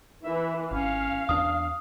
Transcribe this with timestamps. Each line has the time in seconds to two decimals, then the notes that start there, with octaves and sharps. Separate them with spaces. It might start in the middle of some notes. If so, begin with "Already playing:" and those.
0.24 E3 E4 E5
0.71 G#1 C#4 F5
1.29 E2 D4 D#6